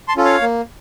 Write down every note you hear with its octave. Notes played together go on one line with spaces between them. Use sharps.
A5 C6
C#4 F4 A4
C#5 F5
A#3